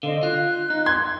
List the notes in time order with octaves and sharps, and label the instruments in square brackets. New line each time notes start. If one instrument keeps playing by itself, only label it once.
[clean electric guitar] D3 [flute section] C5 D#5 F5
[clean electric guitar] F4 [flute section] F#6
[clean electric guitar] D#4
[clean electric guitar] C6 [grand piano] G#6